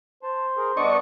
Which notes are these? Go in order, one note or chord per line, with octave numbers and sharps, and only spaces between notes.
C5 A5
G#4 A#4
G2 B3 D4 D5 D#5 C#6